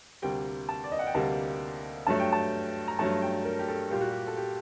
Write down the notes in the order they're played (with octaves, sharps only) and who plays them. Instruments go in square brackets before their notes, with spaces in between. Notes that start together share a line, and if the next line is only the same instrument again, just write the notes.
[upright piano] D2 C3 G3 A#3 G5
A5
D5
D#5
F#5
G5
D2 C3 G3 A#3 A5
G2 F#3 A3 A5
G5
A5
A#5
G2 F#3 A3 A5
G5
A#4
G4
A4
A#2 G3 A#3 G4
F#4
G4
A4
G4